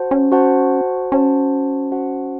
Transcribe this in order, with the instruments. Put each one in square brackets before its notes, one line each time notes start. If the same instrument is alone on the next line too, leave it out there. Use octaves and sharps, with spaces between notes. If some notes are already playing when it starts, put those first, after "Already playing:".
Already playing: [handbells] F#4 C5 F#5 A5
[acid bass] C#4
[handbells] F#4 C5 F#5 A5
[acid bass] C#4 [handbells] F#4 C5 F#5 A5
[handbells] F#4 C5 F#5 A5